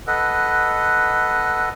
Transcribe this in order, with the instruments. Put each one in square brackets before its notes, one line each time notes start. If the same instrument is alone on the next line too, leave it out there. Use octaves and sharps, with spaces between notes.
[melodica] A4 B4 D#5 F#5